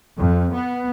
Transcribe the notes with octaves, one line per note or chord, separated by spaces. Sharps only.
F2
B3